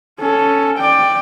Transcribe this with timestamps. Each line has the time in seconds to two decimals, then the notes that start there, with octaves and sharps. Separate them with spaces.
0.19 C#4 A4
0.77 D5 G5